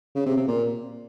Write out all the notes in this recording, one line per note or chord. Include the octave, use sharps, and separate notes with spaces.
C#3
C3
C3
A#2